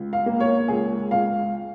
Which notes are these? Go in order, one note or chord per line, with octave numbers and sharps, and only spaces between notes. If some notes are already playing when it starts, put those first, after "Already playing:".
Already playing: C#2
F5
A#3
C#5
C#2 G#4
C#2 F5